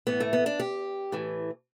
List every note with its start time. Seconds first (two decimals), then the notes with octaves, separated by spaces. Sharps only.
0.07 A2 E3 B3
0.20 A3
0.33 B3
0.46 D4
0.60 G4
1.12 A2 E3